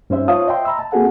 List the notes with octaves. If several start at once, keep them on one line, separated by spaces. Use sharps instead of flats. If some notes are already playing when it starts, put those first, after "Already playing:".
G2 C#4 D#4 C5 E5
F4 C5 C#5 F5 A5 D#6
D#5 E5 G5 C6
A#5 B5 E6
A5
A#3 C4 F#4 G#4 A4 F#5